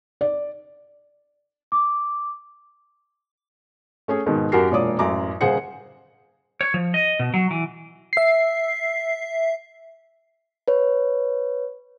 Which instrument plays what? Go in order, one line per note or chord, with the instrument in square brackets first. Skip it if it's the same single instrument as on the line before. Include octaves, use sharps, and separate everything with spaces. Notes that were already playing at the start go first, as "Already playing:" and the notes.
[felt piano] D5
[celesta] D6
[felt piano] A3 C#4 G#4
G#2 B2 D#3
F#2 F#4 G4 A#4 C7
E1 A#2 C#5 D5 D6 D#6
A1 F#2 A#5 D6
D#1 C#3 G#4 C5 F#5 C#7
[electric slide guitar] C#5
F3
D#5
B2
F#3
E3
[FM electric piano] E5 C7
[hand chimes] B4 C#5